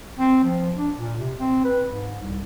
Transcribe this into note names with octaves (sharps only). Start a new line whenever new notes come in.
C4
F3
D4
A#2
C3
C4
B4
G#2
C2